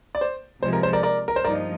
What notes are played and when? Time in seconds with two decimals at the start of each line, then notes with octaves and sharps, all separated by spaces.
0.15 D5
0.21 C5
0.62 C3 F3 G#3 C5
0.73 A#4
0.83 C5
0.93 A#4 D5
1.03 A#4 D5
1.28 A#4
1.36 C5
1.44 G2 F3 A#3 D#4 A#4 D5